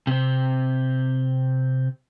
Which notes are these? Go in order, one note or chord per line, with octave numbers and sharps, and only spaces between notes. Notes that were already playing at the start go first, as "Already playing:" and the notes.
C3 C4